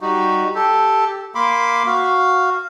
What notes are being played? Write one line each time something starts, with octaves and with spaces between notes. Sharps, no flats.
G3 D#4 F#4
G4 A4
A#3 B5 C6 D6
F#4 F5